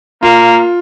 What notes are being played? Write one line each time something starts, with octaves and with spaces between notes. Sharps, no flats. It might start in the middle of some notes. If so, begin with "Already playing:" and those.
A#3 F4